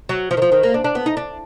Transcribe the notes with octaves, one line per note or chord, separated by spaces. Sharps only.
F#3
F3
D#3
F3
D#3
A#3
D4
D4
B3
D#4
D4